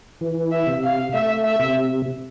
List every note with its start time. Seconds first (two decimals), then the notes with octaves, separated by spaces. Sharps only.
0.21 E3
0.52 E5
0.67 C3
0.83 F5
1.14 A3 E5
1.45 E5
1.60 C3